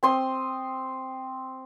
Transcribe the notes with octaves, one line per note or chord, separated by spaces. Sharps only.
C4 C6 D#6